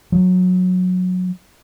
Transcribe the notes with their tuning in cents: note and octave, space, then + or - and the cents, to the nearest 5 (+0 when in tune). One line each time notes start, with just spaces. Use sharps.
F#3 -20